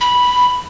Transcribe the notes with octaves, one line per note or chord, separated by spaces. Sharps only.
B5